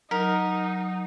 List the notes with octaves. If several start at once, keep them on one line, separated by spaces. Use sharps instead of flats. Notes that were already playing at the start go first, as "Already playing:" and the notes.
F#3 D#4 A#4